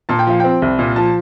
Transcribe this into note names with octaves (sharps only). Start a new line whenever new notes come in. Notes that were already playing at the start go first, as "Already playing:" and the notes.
A#2 A5
G5
F3 F5
C4 G5
C2
A#2
F3 A5